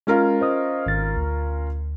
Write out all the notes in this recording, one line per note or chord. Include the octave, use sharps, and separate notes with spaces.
G#3 C#4 F4 A#4
C5 D#5 D#6
G#1 A6
D2